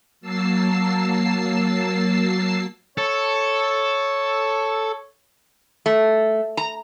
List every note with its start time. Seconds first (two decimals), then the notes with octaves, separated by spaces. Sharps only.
0.21 F#3 A#3 A5 E6 C7
2.98 A4 C#5
5.86 A3
6.57 A#5